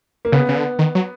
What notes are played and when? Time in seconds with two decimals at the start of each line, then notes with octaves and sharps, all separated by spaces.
0.25 A#3
0.32 C#3 B3
0.49 C#3
0.56 D3
0.79 D#3
0.95 F#3